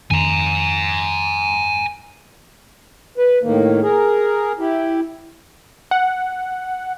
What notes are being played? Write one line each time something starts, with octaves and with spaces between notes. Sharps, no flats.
F2 D#3 G#5 A#5
B4
A2 D#3 A#3
G#4 A#4
E4 G4
F#5